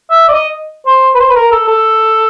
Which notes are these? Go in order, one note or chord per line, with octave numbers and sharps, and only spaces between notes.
E5
D5
D#5
C5
B4
C5
B4
A#4
A4
A4